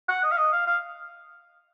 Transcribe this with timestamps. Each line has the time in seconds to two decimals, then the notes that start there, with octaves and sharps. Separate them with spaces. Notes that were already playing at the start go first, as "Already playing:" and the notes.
0.08 F#5
0.23 D#5
0.31 F5
0.37 D#5
0.52 F5
0.67 F5